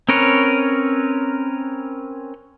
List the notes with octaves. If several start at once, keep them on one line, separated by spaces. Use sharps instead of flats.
C4 C#4 A#4 B4 C#5